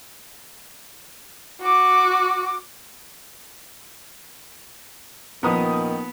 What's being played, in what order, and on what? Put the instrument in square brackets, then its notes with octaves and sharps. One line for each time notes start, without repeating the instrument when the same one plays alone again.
[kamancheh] F#4 D6
[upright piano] D#1 F3 D#6 [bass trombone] D#3 [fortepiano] B3 A#5